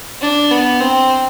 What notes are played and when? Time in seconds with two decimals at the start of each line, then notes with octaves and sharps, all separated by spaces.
0.22 D4
0.51 B3
0.80 C4